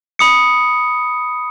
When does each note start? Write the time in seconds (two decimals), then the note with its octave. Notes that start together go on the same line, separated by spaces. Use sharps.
0.19 B5 D#6 C#7